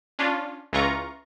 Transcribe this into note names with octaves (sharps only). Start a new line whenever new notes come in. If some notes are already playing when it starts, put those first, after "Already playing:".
C#4 D4 F4
C#2 E3 F4 A#5 C#6